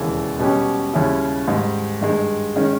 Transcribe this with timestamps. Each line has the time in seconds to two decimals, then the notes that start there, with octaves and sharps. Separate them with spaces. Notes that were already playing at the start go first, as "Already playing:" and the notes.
Already playing: E1 D#2 C#3 E3
0.39 B2 G3 C#4 G4
0.93 D#2 C#3 G3 C#4 E4
1.48 G#2 D#3 G3
2.01 G2 D#3 G#3
2.56 D#3 G#3 C#4